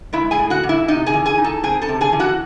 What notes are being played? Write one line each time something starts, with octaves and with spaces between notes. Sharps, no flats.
G#3 E4 E5
G#4 G#5
A2
F#4 F#5
E3
E4 E5
C3 D#4 D#5
G#4 G#5
E3
G#4 G#5
D#4
A4 A5
C4 G#4 G#5
A4 A5
C3
G#4 G#5
E3
F#4 F#5